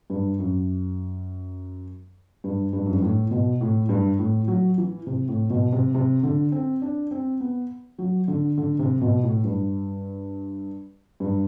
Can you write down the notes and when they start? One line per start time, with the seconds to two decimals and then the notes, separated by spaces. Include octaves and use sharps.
0.10 G2
0.39 F#2
2.44 G2
2.73 G2
2.86 F#2
2.93 G2
3.02 A2
3.31 B2
3.61 A2
3.89 G2
4.19 A2
4.48 F#3
4.78 E3
5.07 C3
5.28 A2
5.50 B2
5.72 C3
5.95 C3
6.23 D3
6.52 C4
6.82 D4
7.11 C4
7.40 B3
7.98 F#3
8.28 D3
8.58 D3
8.79 C3
9.01 B2
9.23 A2
9.44 G2
11.20 G2